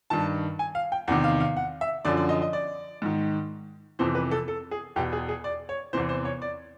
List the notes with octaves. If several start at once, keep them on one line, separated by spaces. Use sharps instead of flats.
G2 D#3 A5
G#5
F5
G5
E2 C3 D#3 F#5
F5
F5
F#5
E5
F#2 D3 F3 D5
D5
D#5
D#5
D5
G#2 D#3
F2 C3 E3 C5
B4
A4
A4
G#4
E2 B2 G4
G#4
G#4
D5
C#5
E2 C3 E3 C5
C5
C#5
D5